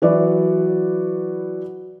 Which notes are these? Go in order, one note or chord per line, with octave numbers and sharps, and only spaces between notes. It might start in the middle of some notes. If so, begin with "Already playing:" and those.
E3 F#3 F#4 B4 D5